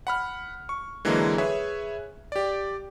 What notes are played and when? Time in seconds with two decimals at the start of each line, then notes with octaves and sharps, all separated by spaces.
0.07 F#5 B5 F6
0.69 C#6
1.05 D3 E3 F#3 G#3 A#3
1.38 G#4 B4 C#5 E5
2.32 G4 D5